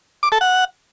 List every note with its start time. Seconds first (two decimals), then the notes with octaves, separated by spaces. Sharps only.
0.23 D6
0.32 A4
0.41 F#5